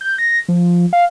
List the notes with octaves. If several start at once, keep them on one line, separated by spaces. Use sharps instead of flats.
G6
A#6
F3
F5